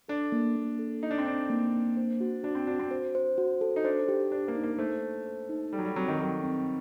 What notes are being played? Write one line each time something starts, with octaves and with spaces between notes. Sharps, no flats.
D4 A4
A#3
A#3
A4
D#4 A4
D4
C4
D4 D#4
A#3
A#3
C5
F#4
D4 F#4
C4
D4 F#4
C4
C5
C5
F#4
A4
D#4
D4 C5
G4
D4 C5
A#3
D#4
A#3
A3 C5
C5
C5
D#4
G3 A4
F#3
G3
F#3 C4
D#3
F#3 A4
C4